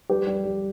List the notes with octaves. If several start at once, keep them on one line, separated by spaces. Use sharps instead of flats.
G3 G4 B4
G3
G3